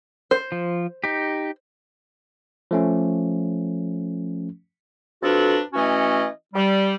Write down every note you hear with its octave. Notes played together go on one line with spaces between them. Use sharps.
C5
F3
D#4 G4
F3 A3 C#4
F2 D4 F#4 A4 B4
E3 A3 C#4 F#4 D#5
G3